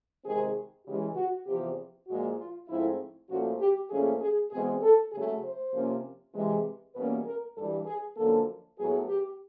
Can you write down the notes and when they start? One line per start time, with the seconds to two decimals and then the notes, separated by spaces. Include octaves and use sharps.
0.25 C3 D#3 G#3 C4 G#4
0.85 C#3 E3 G#3 G4
1.16 F#4
1.46 E2 C3 F3 G4
2.07 A#2 F3 G#3 F#4
2.38 F4
2.68 G#2 F3 A3 C4 E4
3.29 A#2 F3 A3 C#4 F#4
3.60 G4
3.90 A#2 F3 A3 C#4 G#4
4.21 G#4
4.51 E2 B2 G#3 C4 G#4
4.82 A4
5.12 C#3 F#3 A3 G#4
5.43 C5
5.73 C3 F3 A#3 C#4
6.34 C3 E3 G#3
6.95 E2 B2 G3 A#3 C#4 B4
7.25 A#4
7.56 G2 E3 G3 A4
7.86 G#4
8.17 F#2 D3 F3 A#3 A4
8.78 A2 F#3 B3 G#4
9.09 G4